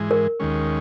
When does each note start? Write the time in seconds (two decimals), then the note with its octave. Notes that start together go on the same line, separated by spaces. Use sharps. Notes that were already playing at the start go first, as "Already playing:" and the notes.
Already playing: G#2 E3 G#3
0.11 A#4
0.40 D#2 D#3 G#3 C#4